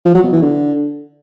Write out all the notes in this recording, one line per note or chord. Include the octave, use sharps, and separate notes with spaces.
F3
F#3
B2
E3
D3